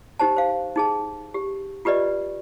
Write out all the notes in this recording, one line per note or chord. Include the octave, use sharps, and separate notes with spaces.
D#4 G4 C5 A5
C5 F5
D#4 G#4 A5
G4
F4 G4 B4 D5 D#5